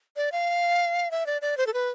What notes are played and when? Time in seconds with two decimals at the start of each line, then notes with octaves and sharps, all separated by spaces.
0.17 D5
0.32 F5
1.11 E5
1.26 D5
1.42 D5
1.57 C5
1.67 A4
1.74 B4